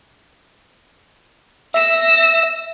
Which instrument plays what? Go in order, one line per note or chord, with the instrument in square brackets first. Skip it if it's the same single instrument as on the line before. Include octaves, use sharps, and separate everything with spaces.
[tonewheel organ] E5 [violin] E6 A#6